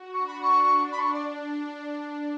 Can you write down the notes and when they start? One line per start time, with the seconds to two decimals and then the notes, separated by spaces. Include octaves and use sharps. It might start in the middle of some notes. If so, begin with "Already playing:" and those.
Already playing: F#4
0.13 D4 C#6
0.27 B5
0.42 C#6
0.92 B5
0.99 D4 C#6
1.13 D5